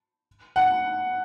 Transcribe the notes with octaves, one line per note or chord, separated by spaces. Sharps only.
F#5